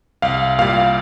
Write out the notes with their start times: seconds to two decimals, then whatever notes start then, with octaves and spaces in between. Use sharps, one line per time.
0.22 C2 F5
0.59 A#2 G3 F5